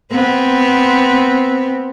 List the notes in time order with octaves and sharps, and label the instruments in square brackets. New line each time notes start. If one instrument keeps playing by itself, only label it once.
[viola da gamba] B3 C4